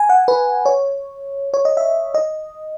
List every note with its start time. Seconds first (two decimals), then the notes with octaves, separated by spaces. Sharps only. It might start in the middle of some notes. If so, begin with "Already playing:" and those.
Already playing: G#5
0.09 F#5
0.28 B4
0.66 C#5
1.54 C#5
1.65 D#5
1.77 E5
2.14 D#5